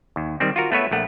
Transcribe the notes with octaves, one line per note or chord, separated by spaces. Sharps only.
D#2
D#3 G3 C4
F4 F#4 A#4
A3 B3 B4 C#5 E5
A#1 A3 F#5